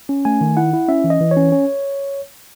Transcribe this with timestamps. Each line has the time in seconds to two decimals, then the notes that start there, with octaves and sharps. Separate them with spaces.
0.09 C#4
0.25 A3 G#5
0.41 D#3
0.57 E4 F#5
0.73 E4
0.88 C#4 E5
1.04 E3
1.10 D#5
1.21 E3
1.31 C#5
1.37 C#4
1.52 C#4